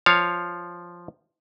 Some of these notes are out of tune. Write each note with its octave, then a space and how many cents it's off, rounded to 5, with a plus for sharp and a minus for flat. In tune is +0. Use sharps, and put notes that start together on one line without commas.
F3 +0 C#5 +5 F5 +0